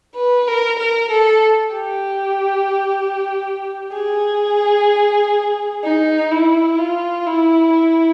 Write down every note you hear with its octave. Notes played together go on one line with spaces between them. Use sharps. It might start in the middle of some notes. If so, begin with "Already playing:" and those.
B4
A#4
A#4
A4
G4
G#4
D#4
E4
F4
E4
E4